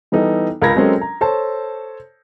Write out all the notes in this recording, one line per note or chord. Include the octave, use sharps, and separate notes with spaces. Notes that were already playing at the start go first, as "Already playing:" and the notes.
E3 G3 B3 D#4 A4
C#2 A#4 B5 G#6 A#6
F#3 G#3 C4 C#4 A4 A#4
A#5
A4 C5 C#5 A5